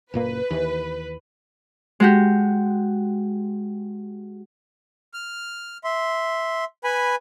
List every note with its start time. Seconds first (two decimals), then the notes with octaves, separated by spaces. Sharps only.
0.14 F#1 A#2 A#3 B4
0.50 D#2 E3
2.00 G#3 F#4 G4
5.14 F6
5.84 E5 C6
6.84 B4 G#5 B5